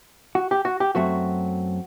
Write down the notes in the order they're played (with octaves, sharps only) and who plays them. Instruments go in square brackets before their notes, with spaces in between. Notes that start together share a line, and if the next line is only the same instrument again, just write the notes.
[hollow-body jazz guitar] F#4
G4
F#4
G4
F#2 F#3 A3 C4 F#4